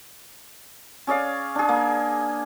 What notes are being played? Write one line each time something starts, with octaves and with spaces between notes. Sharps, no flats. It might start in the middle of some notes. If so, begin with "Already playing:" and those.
C#4 G#4 D5 F5
D4 G#4
A#3